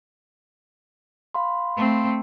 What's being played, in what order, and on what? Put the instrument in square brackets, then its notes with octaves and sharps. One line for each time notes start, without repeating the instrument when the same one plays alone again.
[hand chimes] F5 B5 C6
[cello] A3 C4